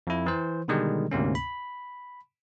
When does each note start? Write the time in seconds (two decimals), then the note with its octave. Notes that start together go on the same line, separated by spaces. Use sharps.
0.07 F2 E4
0.26 E3 C5
0.68 B2 D3 D#3 G3 G#3
1.11 D2 G#2 C3 A#3 C#4
1.35 B5